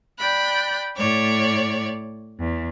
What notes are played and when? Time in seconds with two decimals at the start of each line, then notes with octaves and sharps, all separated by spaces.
0.18 D5 G5 B5 F#6
0.97 A2 C#5 D5
2.39 E2